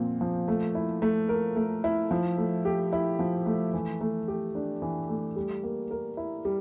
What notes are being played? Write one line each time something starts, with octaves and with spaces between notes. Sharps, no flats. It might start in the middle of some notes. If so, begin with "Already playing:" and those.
Already playing: A#2 F3 C4
F3
A3
E4
A3
A#4
A3
E4
F3
A3
G4
E4
F3
A3
E3
A3
G4
D4
E3
A3
G3
A#3
A#4
E4
G3